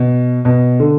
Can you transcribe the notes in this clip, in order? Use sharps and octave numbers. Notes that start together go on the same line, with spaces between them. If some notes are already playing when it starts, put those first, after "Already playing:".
Already playing: B2
B2
D3